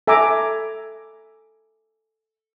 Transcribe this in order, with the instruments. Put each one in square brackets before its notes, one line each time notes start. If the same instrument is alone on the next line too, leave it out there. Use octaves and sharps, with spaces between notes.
[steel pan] A4 E5 G#5 A#5 D6